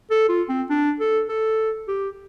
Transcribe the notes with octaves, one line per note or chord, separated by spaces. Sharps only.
A4
F4
C4
D4
A4
A4
G4